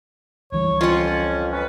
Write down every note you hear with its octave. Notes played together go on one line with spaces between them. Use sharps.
C#2 E3 G3 C#5
F2 C#4 F4 F#5
C#4 B4